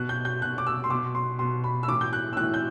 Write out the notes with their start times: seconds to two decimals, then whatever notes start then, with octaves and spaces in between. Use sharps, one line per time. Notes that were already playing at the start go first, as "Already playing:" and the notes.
Already playing: B2 F#6
0.09 G6
0.25 G6
0.42 B2 F#6
0.58 D6
0.67 E6
0.84 C6
0.90 B2 D6
1.15 C6
1.39 B2 C6
1.64 B5
1.83 E6
1.88 A2 E3 D6
2.01 G6
2.13 F#6
2.33 E6
2.37 A2 E3 F#6
2.54 G6